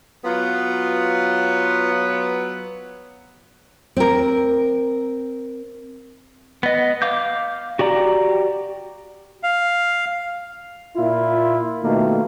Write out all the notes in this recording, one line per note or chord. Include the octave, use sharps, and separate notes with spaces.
F#3 B3 F4
C4 A#4
B3 D#5
F5 D6 G6
F#4 G4 D5 A#5
F5
A#2 E4 F4
B2 D#3 A3 A#3